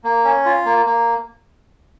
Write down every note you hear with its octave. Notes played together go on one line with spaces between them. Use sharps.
A#3
C#4
F4
A#3
A#3